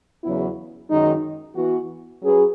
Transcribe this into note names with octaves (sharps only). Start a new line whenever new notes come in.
E2 C#3 F#3 B3 E4
F#2 D#3 G#3 D#4
E3 B3 F#4
F#3 C#4 G#4 B4